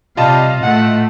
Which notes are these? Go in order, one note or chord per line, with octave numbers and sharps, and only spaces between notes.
C3 G3 F4 D#5 F5 A5
A2 A3 F#5